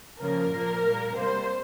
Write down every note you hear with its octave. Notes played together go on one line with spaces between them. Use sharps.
C#3 F3 A#3 A#4
A#2 F3 A#3
A#2 G3 A#3
C3 G3 A#3 C5